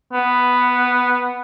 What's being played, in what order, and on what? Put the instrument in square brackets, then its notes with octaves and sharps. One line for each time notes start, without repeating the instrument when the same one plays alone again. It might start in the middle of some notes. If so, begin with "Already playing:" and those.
[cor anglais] B3